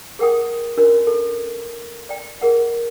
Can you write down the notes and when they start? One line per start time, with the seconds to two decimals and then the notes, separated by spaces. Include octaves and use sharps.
0.19 G#4 A#4 F#5 G5 D#6
0.77 C#4 D4 F#4 A#4
1.07 A4
2.09 D5 G5
2.41 G#4 A#4 F#5